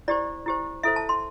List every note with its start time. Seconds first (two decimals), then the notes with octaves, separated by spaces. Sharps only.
0.08 E4 G4 C5 D5
0.46 E4 G4 C5
0.83 E4 A4 C5 E5
0.96 A5
1.09 C6